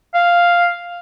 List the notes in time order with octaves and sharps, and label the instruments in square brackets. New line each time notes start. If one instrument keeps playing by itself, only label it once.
[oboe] F5